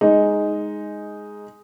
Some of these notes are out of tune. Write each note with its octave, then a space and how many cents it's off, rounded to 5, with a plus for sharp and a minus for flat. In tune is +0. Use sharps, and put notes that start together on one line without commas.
G#3 +0 D#4 +0